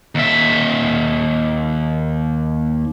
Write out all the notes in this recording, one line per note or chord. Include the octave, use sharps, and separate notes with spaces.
D#2 E5